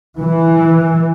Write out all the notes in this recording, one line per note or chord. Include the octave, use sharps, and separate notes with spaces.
E3